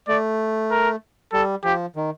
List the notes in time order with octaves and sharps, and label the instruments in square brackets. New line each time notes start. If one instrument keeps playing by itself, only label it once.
[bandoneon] A3 [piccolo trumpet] D5
[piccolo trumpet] A#4
[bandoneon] G3 [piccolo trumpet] A4
[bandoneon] F3 [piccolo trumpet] G4
[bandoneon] D#3